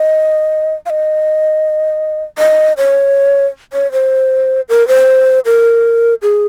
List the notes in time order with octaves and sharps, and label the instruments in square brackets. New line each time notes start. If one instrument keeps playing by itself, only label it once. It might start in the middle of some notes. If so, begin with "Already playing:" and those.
Already playing: [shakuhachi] D#5
F5
D#5
D#5
C#5
C#5
C5
A#4
C5
A#4
G#4